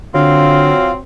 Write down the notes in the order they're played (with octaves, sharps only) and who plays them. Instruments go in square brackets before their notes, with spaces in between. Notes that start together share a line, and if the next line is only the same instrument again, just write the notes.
[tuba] D3 [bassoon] F#3 [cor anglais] C4 [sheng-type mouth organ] F4 F5